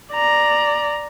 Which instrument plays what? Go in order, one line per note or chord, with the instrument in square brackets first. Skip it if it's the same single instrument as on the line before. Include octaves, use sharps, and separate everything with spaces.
[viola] D5 A#5